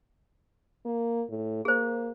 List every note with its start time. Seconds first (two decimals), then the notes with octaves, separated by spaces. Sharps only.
0.85 A#3
1.29 A2
1.65 A#3 G#4 C5